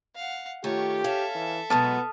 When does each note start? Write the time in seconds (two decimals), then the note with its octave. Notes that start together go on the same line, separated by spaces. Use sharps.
0.16 F5 F#5
0.64 D#3 A3 F4 G4 C#5
1.04 C#4 A4 E5 F5
1.35 E3
1.70 B2 F#3 G#3 B3 A5 D#6 F6